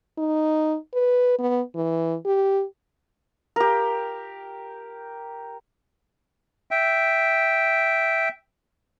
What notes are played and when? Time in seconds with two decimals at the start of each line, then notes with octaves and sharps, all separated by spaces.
0.18 D#4
0.94 B4
1.39 B3
1.75 E3
2.26 G4
3.56 G4 A#4
6.71 E5 G5